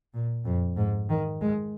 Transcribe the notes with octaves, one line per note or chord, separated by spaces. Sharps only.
A#2
F2
G#2
D#3
G#3